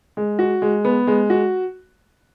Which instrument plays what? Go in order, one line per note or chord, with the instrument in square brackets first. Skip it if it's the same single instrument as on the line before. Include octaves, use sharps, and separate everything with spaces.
[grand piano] G#3
F#4
G#3
B3
G#3
F#4